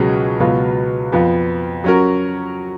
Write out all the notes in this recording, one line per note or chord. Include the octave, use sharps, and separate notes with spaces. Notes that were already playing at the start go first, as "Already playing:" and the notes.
Already playing: C#2 B2 F#3 C#4 G#4
C#2 B2 F#3 B3 F4
F2 F3 B3 F4
F#3 C#4 F#4 A#4